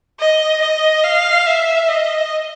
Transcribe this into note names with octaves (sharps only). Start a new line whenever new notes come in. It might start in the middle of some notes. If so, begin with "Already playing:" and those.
D#5
D#5
F5
E5
D#5